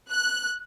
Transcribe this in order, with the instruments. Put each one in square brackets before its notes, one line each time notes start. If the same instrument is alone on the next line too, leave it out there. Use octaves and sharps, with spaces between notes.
[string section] F#6